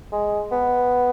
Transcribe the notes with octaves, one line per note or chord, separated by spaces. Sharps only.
G#3
B3